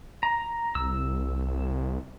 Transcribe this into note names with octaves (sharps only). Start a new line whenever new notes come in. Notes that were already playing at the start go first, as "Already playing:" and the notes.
A#5
C2 E6